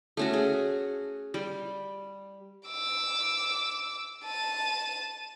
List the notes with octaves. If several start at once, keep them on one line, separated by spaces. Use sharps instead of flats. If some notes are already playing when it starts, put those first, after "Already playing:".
A3 C#4 F#4
G#4
G3
D6 E6
A5 D#7